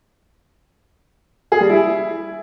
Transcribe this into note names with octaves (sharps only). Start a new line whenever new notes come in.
G#4
G3
E4